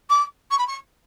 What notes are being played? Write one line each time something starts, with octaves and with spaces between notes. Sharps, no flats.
D6
C#6
B5
C#6